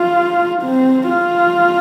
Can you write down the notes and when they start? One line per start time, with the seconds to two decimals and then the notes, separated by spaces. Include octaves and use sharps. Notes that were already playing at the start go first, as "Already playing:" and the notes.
Already playing: F4
0.62 C4
1.09 F4